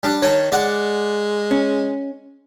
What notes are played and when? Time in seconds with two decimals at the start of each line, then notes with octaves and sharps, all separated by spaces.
0.03 G3 D4
0.22 D#3 C#5 A5
0.52 G#3 D5 F#5
1.51 C#4